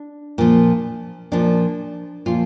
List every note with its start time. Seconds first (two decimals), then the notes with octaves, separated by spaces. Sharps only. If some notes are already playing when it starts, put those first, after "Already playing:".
Already playing: D4
0.38 A#2 F3
1.32 A#2 F3 D4
2.26 A#2 F3 F4